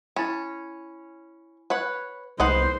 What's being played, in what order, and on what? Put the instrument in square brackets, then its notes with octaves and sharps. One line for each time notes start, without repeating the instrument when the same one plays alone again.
[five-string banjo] C#4 [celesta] E4 G#5 B5
[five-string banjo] B4 C#5 F#5
[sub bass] C2 [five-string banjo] D#4 B4 F#5 [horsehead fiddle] C5